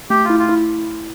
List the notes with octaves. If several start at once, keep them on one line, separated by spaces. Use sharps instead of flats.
A3 G4
F4
E4
F4
E4